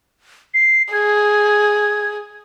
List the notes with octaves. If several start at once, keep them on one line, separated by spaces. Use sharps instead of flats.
C7
G#4 G#6